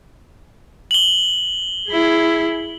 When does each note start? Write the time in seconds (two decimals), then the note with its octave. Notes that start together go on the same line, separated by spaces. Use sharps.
0.91 F#7 G7
1.89 E4 G#4